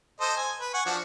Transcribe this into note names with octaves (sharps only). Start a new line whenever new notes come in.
A4 C5 D#5
G#5
B4
F#5 G#5 C#6
F3 D4 F#4